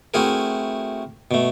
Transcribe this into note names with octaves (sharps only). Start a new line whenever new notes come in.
A3 C4 E4 F#4 G#4 A#4
B2 A3